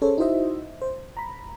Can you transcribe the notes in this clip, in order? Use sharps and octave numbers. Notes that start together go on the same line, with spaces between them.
C#4 G#4 A4 C5 C#5
D#4 E4 F#4 C5 D#5 E5
C5
A#5 B5